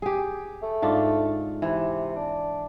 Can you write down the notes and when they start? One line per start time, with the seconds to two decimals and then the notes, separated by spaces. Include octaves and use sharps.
0.02 G4 G#4
0.62 A3
0.82 G#2 D4 F4
1.62 C3 E3
2.16 D4